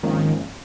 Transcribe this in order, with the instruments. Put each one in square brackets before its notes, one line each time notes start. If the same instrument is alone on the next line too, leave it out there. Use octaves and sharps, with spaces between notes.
[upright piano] G#1 G#2 F3 A#3 C#4 [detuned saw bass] D#3